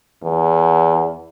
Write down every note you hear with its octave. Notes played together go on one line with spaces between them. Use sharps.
E2